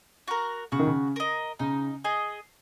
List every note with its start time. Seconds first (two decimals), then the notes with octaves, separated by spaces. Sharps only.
0.28 F#4 A#4
0.72 C#3 F#4
0.79 D#3
0.87 C#3
1.16 A#4 D#5
1.59 C#3 D#4
2.05 G#4 D#5